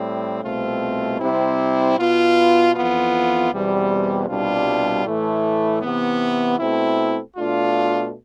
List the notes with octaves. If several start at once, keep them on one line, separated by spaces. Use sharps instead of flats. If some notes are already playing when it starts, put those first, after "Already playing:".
Already playing: A2 G3 C4
C2 B2 A3 C4 F4
C3 G3 C4 E4
B2 B3 F4
F2 E3 B3 F4
E2 B2 G3 C4
C2 B2 G3 D4 F4
A2 E3 A3 E4
C3 E3 B3
B2 A3 C4 E4
B2 A3 D4 F4